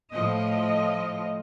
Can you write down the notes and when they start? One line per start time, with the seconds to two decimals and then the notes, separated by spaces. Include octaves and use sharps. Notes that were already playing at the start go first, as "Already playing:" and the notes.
0.11 A2 F3 D#5